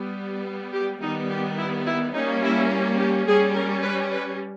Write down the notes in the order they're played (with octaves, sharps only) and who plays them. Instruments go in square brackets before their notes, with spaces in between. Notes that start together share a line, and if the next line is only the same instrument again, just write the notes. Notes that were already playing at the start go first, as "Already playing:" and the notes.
Already playing: [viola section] G3 B3
G4
D#3 G3 B3 D#4
G4
E4
E4
G3 A#3 C#4 D#4
E4
G4
G3 C#4 G#4
A#4
B4
B4